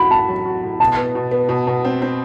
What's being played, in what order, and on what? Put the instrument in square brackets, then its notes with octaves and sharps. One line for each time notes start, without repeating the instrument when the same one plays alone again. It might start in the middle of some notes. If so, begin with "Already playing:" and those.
Already playing: [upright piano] A2 F#4 [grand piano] B5
[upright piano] A2 [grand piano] A5
[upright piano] F#3
F#4
A2
[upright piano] B2 [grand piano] A5
[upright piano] B3
B2
B3
B2
B2
C4
C4